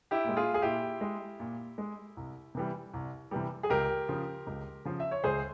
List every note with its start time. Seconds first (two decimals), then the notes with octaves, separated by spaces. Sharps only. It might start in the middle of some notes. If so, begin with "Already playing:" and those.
0.11 E4 G4
0.24 A#2 G#3
0.37 F4 G#4
0.54 G#4
0.62 A#2 E4 G4
1.01 G#3
1.40 A#2
1.78 G#3
2.17 C2
2.55 C3 E3 G3
2.93 C2
3.31 C3 E3 G3
3.63 G#4
3.70 C#2 G4 A#4
4.08 C#3 F3
4.46 C#2
4.85 C#3 F3
5.00 E5
5.11 C#5
5.24 C#2 G#4 C5